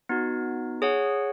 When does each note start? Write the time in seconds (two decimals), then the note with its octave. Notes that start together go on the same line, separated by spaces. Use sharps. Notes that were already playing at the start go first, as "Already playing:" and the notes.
0.09 B3 D#4 F#4
0.82 G#4 C#5 F#5